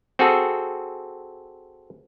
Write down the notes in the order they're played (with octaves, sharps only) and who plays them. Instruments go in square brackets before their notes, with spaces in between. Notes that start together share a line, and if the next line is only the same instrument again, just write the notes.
[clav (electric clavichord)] C4 F#4 G#4 A4